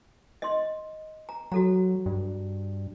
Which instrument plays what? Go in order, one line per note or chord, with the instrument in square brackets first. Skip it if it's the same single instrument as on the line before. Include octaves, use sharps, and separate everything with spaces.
[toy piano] D#5 C6
A#5
[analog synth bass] F#3 [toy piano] F#4 A4 A#5
[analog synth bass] G2